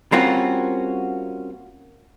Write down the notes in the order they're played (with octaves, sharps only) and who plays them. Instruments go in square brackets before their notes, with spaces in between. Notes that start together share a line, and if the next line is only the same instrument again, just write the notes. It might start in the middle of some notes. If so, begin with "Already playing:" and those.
[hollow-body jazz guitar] G3 A#3 C4 C#4 F4 F#4